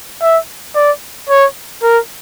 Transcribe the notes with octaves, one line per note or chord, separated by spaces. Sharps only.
E5
D5
C#5
A#4